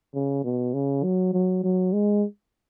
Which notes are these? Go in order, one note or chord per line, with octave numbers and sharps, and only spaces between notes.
C#3
B2
C#3
F#3
F#3
F#3
G#3